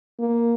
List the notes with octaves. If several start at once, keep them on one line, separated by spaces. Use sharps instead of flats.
A#3